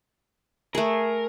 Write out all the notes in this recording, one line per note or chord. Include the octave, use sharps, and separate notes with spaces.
A3 G#4 A#4